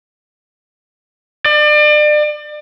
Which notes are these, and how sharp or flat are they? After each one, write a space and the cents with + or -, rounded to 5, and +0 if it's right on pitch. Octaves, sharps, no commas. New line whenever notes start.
D5 +35